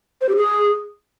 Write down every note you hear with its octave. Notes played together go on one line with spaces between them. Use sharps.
C5
G4
G#4